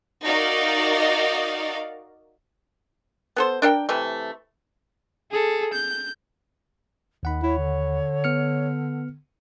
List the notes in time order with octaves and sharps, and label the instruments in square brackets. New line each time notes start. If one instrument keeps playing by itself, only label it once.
[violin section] D#4 F#4 A#4 D5 D#5 F5
[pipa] B3 A4 C5
D4 A#4 F5 G5
C3 E3 A3
[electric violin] G#4 A4
G6
[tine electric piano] D#2 F#5 B5 [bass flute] D#3
[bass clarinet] E4 [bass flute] C#5
[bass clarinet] D3
[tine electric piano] B3 F6 C#7